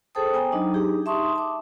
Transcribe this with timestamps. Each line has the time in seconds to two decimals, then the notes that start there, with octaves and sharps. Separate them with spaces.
0.15 G#4 A4 C5 G5 A5 D#6
0.33 B3 G5 G#5 A#5
0.52 F#3 D4 D#4 D#5
0.74 D4 D#4 G4 G#4
1.06 E5 A5 C6 C#6 D#6
1.35 A5 D6